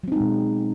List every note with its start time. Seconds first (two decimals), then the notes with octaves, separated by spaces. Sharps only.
0.04 F#3
0.08 C4
0.12 D#4
0.16 G#3
0.20 B2